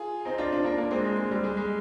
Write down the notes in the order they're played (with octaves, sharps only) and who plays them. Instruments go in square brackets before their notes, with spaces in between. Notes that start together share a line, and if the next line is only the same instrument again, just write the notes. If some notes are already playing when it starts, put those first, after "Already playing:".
Already playing: [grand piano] F4 G#4
C4 D#4
D4 F4
D4 F4
A#3 D4
A#3 D4
G#3 C4
G#3
G#3
G3
G#3
G#3